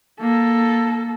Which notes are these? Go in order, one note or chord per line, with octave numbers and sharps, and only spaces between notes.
A#3 A4